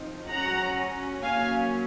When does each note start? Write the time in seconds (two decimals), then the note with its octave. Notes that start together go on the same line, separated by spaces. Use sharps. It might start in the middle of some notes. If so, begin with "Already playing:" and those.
Already playing: F3 C4 D#4
0.30 F#3 C#4 F#5 A#5
1.22 F#3 A#3 C#4 F5 G#5